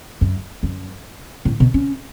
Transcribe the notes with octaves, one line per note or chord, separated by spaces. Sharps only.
F#2
F#2
A2
B2
C#4